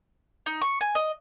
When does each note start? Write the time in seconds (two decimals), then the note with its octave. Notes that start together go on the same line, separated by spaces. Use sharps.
0.46 D#4
0.61 C#6
0.81 G#5
0.95 D#5